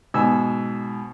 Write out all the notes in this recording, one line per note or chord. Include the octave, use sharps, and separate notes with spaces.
G#2 B2 G#5 E6